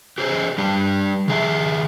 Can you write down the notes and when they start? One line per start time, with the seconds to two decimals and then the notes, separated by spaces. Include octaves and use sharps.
0.18 G4 G#4 C5
0.58 G3 D4 G4
1.28 D#3 G#4 E5